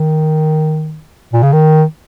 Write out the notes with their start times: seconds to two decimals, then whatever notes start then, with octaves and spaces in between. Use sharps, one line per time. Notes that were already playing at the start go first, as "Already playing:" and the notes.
Already playing: D#3
1.33 A#2
1.43 C#3
1.53 D#3